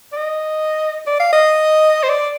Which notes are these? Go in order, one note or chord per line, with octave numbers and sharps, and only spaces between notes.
D5
D#5
D5
F5
D#5
C5
D5